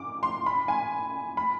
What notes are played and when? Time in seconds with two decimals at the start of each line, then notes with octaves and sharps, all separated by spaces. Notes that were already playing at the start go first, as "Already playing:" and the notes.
Already playing: D6
0.23 C6
0.46 B5
0.68 G#5
1.37 B5